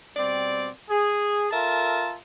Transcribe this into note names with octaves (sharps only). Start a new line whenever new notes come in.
B2 G3 C4 D5
G#4
F4 A4 A#4 E5 A5